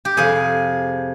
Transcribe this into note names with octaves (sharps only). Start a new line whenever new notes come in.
G4
F2 C3 F3 G#4